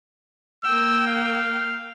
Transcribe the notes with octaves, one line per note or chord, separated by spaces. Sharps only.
A#3 G5 E6
F5